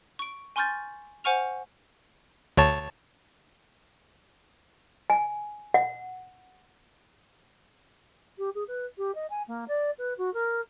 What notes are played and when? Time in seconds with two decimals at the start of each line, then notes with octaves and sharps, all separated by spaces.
0.19 C#6 D7
0.56 G#5 C6 C#6 F6 G6 A6
1.24 C5 F#5 G#5 C#6 F6 F7
2.57 D2 C#5 A5
5.10 G#5
5.74 F#5
8.38 G4
8.55 G#4
8.68 B4
8.98 G4
9.15 D#5
9.30 G#5
9.48 A#3
9.68 D5
9.98 B4
10.18 F#4
10.34 A#4